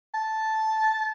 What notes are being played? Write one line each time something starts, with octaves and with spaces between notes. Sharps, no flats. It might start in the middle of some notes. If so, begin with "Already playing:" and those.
A5